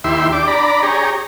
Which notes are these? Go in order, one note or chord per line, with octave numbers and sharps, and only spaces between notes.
D#2 E4 G4 E5 C6
D4 G4 D6
D4 D5 A#5 B5
G4 G#4 C#5 A#5